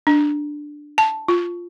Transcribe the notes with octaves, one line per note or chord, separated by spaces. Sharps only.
D4
A5
F4